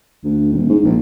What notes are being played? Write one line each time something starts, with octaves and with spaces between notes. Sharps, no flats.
D2
D#1
G#2
A#1